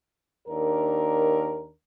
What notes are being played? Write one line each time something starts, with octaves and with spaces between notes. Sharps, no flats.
D#2 D4 A#4